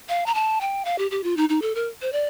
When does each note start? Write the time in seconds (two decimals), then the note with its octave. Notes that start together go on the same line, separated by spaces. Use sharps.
0.09 F5
0.26 A#5
0.34 A5
0.61 G5
0.85 F5
0.98 G4
1.11 G4
1.24 F4
1.37 D#4
1.49 D#4
1.62 A4
1.75 A#4
2.02 C5
2.12 D5